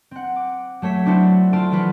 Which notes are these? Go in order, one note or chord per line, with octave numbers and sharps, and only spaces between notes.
C4 F#5
D6
F#3 A3 C#5 B6 E7
C4 D4 E4 F#4 A4 C5
A3 F4 A5 C6 D7
E3 F#3 F4 B4